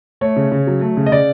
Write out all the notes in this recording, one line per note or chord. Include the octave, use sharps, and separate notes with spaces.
A3 C#5
C#3
C#3
F#3
A3
C#3
D#5
C#3 D5